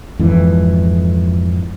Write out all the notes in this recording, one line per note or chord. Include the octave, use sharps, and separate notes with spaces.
F2 G#2 E3